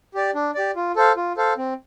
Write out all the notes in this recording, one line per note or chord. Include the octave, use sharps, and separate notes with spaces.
G4 D5
D4
G4 D5
F4
A4 C5 F5
F4
A4 C5 F5
C4